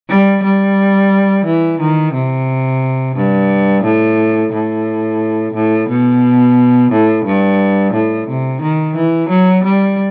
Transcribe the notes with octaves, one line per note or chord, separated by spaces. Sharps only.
G3
G3
E3
D#3
C3
G2
A2
A2
A2
B2
A2
G2
A2
C3
D#3
E3
F#3
G3